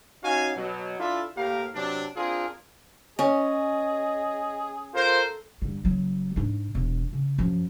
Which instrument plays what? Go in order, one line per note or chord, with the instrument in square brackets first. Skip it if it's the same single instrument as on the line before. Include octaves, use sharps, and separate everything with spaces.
[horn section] C#4 D#4 F#4 F5 G#5
B2 F#3
D4 E4 F4 A4 E5
A2 A#3 G4 A#4 F5
C3 F#3 D4
C4 D4 F4 G#4 A#4
[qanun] C#4 [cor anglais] G#4 [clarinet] D#5
[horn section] F4 A#4 C5 [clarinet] A4
[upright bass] G2 D3
F#1 F#3
G#2 D4
E1
C#3
F#2 F3